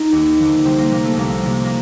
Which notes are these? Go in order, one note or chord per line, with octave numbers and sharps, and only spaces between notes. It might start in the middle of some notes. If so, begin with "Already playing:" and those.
Already playing: D#4
D#2
D3 F3
C2 C4
A#3
C3 F3 A#3
A3
C2 A#3
C3 F3
A#3